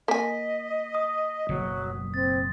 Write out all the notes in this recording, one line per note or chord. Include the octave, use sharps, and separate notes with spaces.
A#3 D#5 G#5 B6
D#6
F#1 B2 F#3
C4 A6